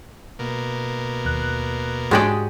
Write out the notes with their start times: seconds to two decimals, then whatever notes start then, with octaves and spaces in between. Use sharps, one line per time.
0.39 B2 A#3
1.25 D#2 F#6
2.11 G#2 G#3 D4 F#4 G4 C#5 D5 D#6